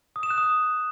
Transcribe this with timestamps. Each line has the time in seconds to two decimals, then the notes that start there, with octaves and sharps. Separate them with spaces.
0.16 D#6
0.23 E7
0.30 F#6
0.38 D#6